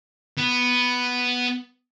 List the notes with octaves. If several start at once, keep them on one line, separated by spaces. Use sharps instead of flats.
B3